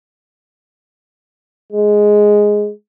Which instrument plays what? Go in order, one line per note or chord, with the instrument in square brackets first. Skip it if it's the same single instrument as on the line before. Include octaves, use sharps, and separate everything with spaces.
[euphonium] G#3